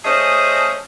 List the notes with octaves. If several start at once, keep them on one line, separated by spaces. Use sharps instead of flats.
A3 C#4 G#4 C5 D#5